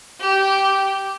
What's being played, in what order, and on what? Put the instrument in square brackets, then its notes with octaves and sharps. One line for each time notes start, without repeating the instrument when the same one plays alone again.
[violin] G4